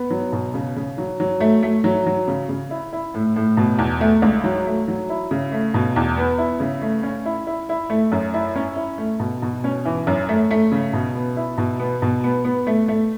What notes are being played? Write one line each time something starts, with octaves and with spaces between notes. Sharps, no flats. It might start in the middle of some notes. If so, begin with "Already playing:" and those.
Already playing: B3
F#3
B2
C#3
C#3
F#3
F#3
A3
A3
F#3
F#3
C#3
C#3
E4
E4
A2
A2
B2
E2
A3
C#2
F#3
A3
F#3
E4
C#3
A3
B2
E2
B3
E4
C#3
A3
C#4
E4
E4
E4
A3
F#2
E4
C#4
E4
A3
B2
B2
C#4
E3
F#2
A3
A3
C#3
B2
B3
E4
B2
B3
B2
B3
B3
A3
A3